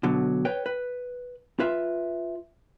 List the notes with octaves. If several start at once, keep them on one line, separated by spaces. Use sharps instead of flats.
B2 D3 F#3
B4 C#5 G5
B4
F4 B4 E5